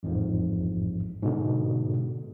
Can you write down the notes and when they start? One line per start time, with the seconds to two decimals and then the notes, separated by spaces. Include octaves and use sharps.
0.03 A1 F2 G#2 F3
1.23 G#2 B2 D3